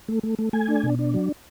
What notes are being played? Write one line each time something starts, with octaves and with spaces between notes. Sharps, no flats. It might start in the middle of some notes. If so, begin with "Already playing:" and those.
A3
A3
A3
A3 G#5
D4
B2
D4
F#3